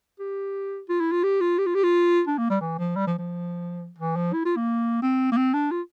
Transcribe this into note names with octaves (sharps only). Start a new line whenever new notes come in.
G4
F4
E4
F4
G4
F4
G4
F4
G4
F4
D4
A#3
G3
E3
F3
G3
F3
F3
E3
F3
E4
F4
A#3
C4
A#3
C4
D4
F4